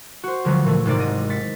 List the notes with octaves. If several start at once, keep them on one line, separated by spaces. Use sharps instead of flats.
F#4 C5
D2 D3 F3 F#3 A3 B3
A#2 E3 A3
G#1 G#2 C3 D5
D#5
A6 B6 C#7